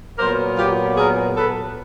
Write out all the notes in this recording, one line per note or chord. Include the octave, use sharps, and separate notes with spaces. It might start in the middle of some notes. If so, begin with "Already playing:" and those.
A#2 F#3 B3 A#4 C5
F4 G4
G#4 A#4
A4 B4